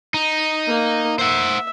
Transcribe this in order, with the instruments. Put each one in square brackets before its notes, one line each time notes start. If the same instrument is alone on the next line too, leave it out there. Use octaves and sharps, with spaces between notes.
[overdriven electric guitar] D#4
[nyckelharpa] A#3
[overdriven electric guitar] C5 F#5 [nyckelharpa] E5